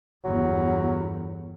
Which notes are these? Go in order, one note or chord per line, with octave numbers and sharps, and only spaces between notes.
G1 E2 F#3